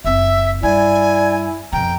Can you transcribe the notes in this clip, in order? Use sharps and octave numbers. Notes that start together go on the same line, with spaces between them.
F#1 C4 E5
G2 E4 D5 G#5
F2 B2 G5 A#5